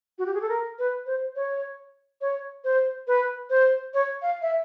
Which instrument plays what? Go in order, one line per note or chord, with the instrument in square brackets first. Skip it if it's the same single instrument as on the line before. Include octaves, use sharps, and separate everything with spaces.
[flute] F#4
G4
G#4
A4
A#4
B4
C5
C#5
C#5
C5
B4
C5
C#5
F5
E5